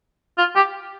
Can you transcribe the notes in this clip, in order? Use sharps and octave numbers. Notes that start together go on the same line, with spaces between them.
F4
G4